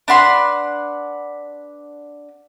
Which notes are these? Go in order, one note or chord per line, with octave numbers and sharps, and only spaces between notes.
D4 B4 F#5 C6